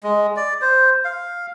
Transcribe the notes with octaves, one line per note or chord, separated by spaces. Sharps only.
G#3
D5
C5
F5